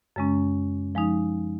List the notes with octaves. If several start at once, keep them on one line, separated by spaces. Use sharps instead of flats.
F#2 C#3 G#3 C#4
F3 G#3 D#4